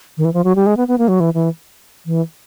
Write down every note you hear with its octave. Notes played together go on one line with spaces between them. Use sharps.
D#3
E3
F3
F#3
G3
G#3
B3
B3
A#3
F#3
E3
E3
E3